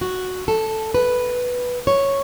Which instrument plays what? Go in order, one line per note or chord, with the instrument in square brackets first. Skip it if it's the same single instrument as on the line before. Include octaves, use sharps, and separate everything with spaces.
[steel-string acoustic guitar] F#4
A4
B4
C#5